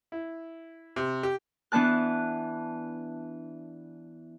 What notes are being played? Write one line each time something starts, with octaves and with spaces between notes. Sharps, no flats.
E4
C3
G4
E3 B3 D4 A5 F#6